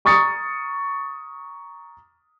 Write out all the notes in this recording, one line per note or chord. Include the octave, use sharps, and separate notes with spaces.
A#5 C#6 D#6 A6 C#7